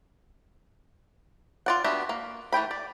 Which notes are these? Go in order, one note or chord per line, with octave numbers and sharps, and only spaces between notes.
F4 D5 F#5
B3 D4 F#4 G4 E5
A#3
E3 A3 G5 B5
D5